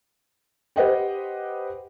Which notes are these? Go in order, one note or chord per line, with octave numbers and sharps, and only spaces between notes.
G4 B4 C5 D#5 F#5 G5